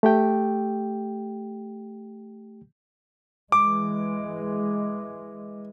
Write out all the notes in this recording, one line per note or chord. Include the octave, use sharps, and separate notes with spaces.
A3 G4 G5
E3 G#3 D6